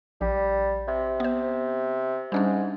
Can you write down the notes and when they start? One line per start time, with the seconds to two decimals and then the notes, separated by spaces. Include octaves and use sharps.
0.21 A#1 G3
0.88 C3
1.20 B3 C5
2.32 G#2 G3 C#4 D4